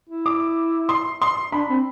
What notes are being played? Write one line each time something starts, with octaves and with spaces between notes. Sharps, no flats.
E4
D6
C6
C6
D4 B5
C4